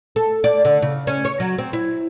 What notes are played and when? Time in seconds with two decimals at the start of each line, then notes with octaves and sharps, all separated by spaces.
0.16 A4
0.44 D5
0.65 D3
0.82 C#3
1.07 C#4
1.25 C#5
1.40 F#3
1.58 C4
1.73 E4